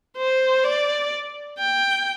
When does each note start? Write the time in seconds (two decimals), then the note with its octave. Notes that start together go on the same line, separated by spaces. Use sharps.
0.17 C5
0.64 D5
1.59 G5